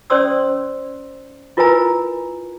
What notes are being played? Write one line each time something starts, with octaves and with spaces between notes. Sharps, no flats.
C#4 C5 D5 C6 D#6 E6
E4 F4 A#4 B4 G#5 A#5